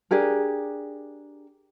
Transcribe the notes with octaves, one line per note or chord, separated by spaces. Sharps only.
D4 G4 G#4 A#4